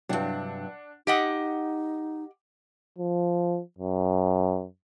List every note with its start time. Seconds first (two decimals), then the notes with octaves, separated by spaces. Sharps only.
0.09 G2 C3 F#3 D4 F#5
1.07 D#4 G4 D#5 F#5
2.98 F3
3.78 F#2